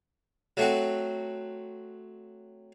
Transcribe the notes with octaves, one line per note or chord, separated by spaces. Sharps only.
F#3 A3 C4 F#4